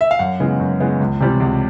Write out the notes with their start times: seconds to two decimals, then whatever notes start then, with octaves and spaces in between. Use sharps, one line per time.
0.01 E5
0.11 F5
0.19 F#2 F#5
0.40 C#3 E3 G#3 B3
0.60 F#2
0.80 C#3 E3 G#3 B3
1.00 C#2
1.20 C3 E3 G3 C4
1.40 C#2